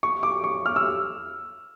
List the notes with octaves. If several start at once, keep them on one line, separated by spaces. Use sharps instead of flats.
C#6
D6
C#6
F6
E6